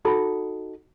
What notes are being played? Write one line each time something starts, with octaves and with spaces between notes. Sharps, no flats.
D#4 F#4 A4 B5